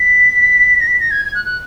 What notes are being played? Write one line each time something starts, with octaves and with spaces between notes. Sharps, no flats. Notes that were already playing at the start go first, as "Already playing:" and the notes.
Already playing: B6
A#6
B6
A#6
G#6
G#6
F#6
F#6